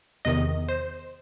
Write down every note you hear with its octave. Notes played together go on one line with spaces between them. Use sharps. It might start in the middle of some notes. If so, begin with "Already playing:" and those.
E2 C3 D#3 D#5
C5